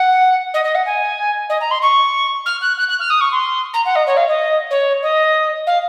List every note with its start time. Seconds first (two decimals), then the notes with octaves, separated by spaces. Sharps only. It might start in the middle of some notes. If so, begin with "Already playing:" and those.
Already playing: F#5
0.54 D#5
0.64 D#5
0.74 F#5
0.85 G#5
1.49 D#5
1.60 A#5
1.70 C6
1.82 C#6
2.45 F6
2.61 F#6
2.77 F#6
2.88 F#6
2.99 F6
3.10 D#6
3.20 C#6
3.31 C6
3.73 A#5
3.85 F#5
3.95 D#5
4.06 C#5
4.16 F5
4.27 D#5
4.70 C#5
5.02 D#5
5.66 F5